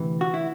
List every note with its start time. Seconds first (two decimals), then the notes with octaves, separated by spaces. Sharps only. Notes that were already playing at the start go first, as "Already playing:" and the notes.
Already playing: D2 C3 E3
0.21 F#4
0.34 E4